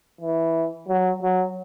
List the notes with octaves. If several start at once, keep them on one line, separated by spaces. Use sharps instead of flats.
E3
F#3
F#3